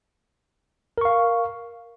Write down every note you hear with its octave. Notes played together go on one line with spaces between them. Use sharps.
A#4 F5 C#6